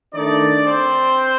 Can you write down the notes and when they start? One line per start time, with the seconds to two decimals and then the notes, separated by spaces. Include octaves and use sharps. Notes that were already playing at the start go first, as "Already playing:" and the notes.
0.15 D#3 A3 D4 D#4 D5
0.67 C4 C5